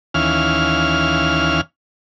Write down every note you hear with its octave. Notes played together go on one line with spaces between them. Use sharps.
D#2 E3 C#4 F5 F6